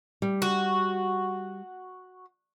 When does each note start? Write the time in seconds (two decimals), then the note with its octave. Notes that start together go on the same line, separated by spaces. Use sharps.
0.22 G3
0.42 F#4